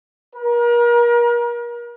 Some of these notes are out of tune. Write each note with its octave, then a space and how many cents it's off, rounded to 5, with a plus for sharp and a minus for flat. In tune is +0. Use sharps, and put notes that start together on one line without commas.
A#4 +35